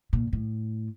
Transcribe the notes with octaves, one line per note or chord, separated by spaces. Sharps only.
A#2
A2